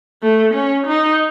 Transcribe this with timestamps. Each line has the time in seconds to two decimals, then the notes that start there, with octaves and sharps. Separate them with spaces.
0.23 A3
0.54 C#4
0.87 D#4